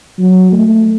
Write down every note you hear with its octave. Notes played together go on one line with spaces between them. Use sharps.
F#3
A3